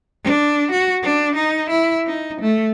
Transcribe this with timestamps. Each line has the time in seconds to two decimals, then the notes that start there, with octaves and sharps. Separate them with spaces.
0.24 D4
0.71 F#4
1.03 D4
1.35 D#4
1.70 E4
2.06 D#4
2.41 A3